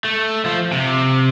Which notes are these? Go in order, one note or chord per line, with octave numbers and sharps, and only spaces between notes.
A3
F3
C3